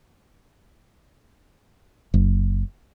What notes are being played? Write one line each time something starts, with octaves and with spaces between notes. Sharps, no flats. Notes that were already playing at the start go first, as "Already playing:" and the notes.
F#1